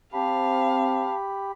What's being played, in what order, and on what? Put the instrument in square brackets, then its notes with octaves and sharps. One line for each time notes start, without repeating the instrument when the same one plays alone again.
[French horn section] C4 [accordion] G4 B5 [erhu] F5 [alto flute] A5